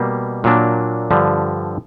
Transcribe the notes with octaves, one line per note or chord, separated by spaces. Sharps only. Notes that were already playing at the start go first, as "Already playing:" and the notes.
Already playing: B2 G3 A#3
A#2 F#3 A#3 D4
G2 D3 F3